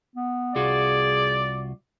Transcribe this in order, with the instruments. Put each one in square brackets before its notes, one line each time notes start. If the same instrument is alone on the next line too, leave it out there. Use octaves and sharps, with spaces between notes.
[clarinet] B3
[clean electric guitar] C2 F4 F#4 [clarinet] G#4 [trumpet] D5